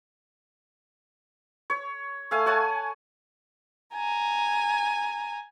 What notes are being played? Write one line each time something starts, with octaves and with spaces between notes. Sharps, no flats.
C#5
A3 F5 G#5
C#5 F#5 G#5 A5
G#5 A#5